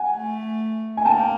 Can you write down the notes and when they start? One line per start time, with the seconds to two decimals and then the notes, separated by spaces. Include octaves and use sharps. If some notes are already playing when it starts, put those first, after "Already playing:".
Already playing: F#5 G#5
0.17 A3
0.97 G#5
1.05 A#3 G5 A5
1.20 G5